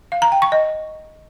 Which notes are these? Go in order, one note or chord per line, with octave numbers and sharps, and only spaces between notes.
F5
A#5
G5
C#6
D#5